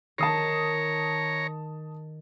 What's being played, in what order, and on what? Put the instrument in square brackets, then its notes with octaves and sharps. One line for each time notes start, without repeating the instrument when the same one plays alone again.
[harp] D#3 [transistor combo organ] C#5 A#5 [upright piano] A5 D#6 C7